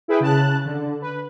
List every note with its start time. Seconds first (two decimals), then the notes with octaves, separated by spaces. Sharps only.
0.08 E4 G#4 B4 G5
0.20 C#3 A5 F#6
0.65 D3
1.02 B4